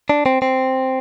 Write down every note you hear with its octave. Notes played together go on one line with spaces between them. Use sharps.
D4
C4
C4